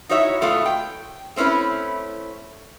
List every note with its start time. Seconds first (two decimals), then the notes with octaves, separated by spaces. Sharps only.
0.09 D#4 E4 F#4 C#5 E5
0.41 B2 A3 B3 F4 A4
0.66 G5
1.36 A3 C4 C#4 E4 B4